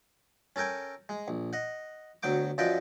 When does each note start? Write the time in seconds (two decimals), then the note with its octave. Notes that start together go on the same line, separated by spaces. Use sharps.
0.56 C#4 A4 A#4 G5 G#5
1.09 G#3
1.28 A#1
1.53 D#5 F#5
2.23 D2 F#3 B3 G5 D6
2.58 F#2 F3 B4 D5 D#5 G5